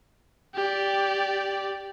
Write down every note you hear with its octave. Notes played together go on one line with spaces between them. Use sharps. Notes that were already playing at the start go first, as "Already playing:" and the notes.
G4 D5